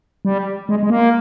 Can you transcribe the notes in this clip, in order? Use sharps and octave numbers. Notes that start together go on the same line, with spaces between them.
G3
G#3
G#3
A#3